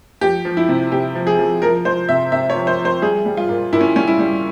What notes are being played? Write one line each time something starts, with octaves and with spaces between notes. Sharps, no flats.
F3 G4
F3
E4
C3
C3 G4
F3
G#4
F3
F3 A#4
F3 C5
C3 E5
C3 E5
C#5
F3
C5
F3
C5
G3 G#4
G3
F4
A#2
A#2 E4
C#4
G3 C#4
E4
G3